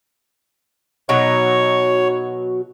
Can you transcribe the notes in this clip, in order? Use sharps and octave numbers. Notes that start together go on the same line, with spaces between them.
B2 F#3 D#4 C#5